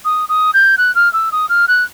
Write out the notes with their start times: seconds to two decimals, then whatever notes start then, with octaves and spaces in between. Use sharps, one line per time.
0.05 D#6
0.29 D#6
0.54 G6
0.78 F#6
0.95 F6
1.13 E6
1.32 D#6
1.49 F6
1.68 F#6